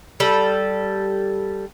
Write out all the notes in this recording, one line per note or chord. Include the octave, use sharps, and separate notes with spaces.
G3 A4